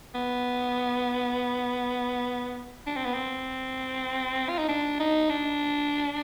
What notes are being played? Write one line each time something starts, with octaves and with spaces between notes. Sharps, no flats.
B3
D4
C4
B3
C4
F4
D#4
D4
D#4
D4